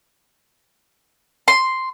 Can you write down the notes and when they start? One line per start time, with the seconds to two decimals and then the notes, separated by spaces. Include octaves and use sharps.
1.48 C6